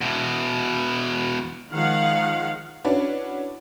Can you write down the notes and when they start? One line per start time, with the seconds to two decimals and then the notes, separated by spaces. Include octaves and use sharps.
0.01 E2 B2
1.71 D#3 F3 G#3 F5 F#5
2.84 C#4 D4 E4 F#4 B4